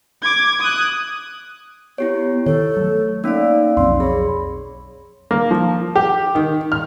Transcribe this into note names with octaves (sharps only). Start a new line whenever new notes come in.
D6 G#6
D#6 F#6
B3 E4 G4 C#5
D#3 A4 C#5
F#3 A3
A#3 C#4 D#4 D5 F5 E6
B1 F2 F#3 C4 C6
G#4 C#5 B5
A#3
F3
G4
D#3
F6